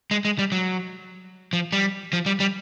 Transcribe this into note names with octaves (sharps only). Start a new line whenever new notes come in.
G#3
G#3
G3
F#3
F3
G3
F3
G3
G3